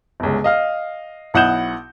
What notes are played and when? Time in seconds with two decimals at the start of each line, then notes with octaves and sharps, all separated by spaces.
0.20 G1 C#2
0.44 D#5 F5 F6
1.34 B1 E4 F#5 D#6 G6 E7